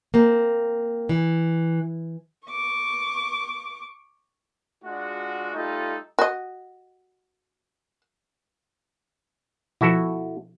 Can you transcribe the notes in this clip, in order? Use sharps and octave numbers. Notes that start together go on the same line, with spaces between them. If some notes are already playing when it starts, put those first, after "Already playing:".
A#3 C4
E3
C#6 D6
G#3 D4 F4 F#4
G3 A3 D#4 F4 A4 D#5
F#4 D#5
B2 F3 E4 F#4 A4